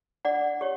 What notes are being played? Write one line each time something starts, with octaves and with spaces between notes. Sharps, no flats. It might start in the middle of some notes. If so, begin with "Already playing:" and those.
D4 D5 F#5
G4 C#5